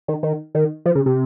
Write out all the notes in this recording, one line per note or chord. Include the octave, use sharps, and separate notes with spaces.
D#3
D#3
D#3
F3
C#3
C3